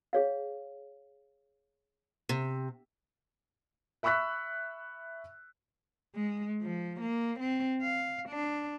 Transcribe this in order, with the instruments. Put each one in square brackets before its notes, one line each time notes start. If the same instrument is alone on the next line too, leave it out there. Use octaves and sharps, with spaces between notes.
[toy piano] G#4 C#5 F5
[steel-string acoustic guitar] C3
[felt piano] E5 B5 C#6 E6 F#6 B6
[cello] G#3
F3
A#3
C4
F5
D4